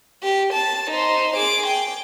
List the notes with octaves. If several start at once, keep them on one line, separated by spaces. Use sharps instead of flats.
G4
A5
D#4 C5
G#4 D6
G5